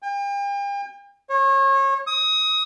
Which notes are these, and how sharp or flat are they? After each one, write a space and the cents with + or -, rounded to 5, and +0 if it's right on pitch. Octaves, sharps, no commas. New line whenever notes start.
G5 +40
C#5 -30
D#6 +25